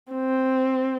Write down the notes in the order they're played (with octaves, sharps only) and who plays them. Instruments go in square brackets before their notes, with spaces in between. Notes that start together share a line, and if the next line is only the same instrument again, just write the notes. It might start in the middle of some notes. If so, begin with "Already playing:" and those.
[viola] C4